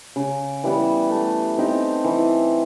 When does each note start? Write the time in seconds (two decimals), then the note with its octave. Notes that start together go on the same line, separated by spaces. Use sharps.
0.16 C#3
0.64 E3 G3 B3
1.10 A3
1.58 C4 D#4 G4
2.04 E3